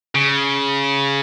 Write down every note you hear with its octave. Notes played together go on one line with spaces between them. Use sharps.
C#3